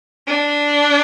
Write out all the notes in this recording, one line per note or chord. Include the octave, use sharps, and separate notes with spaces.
D4